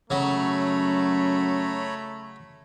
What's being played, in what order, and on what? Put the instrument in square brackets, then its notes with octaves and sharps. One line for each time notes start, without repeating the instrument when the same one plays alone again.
[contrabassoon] F#2 [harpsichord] C#3 F#3 [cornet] A3 [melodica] C#5 A#5 B5